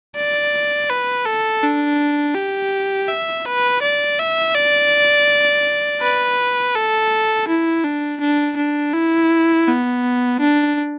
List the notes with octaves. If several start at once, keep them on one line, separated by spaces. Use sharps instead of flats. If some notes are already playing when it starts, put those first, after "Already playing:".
D5
B4
A4
D4
G4
E5
B4
D5
E5
D5
B4
A4
E4
D4
D4
D4
E4
B3
D4